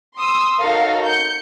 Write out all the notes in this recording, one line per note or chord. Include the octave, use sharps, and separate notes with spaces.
C6 D#6 E6
D#4 F#4 A4 A#4 C#5 F5
G6 C#7